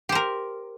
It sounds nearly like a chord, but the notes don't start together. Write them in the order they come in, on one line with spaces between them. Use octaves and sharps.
G4 C5 A#4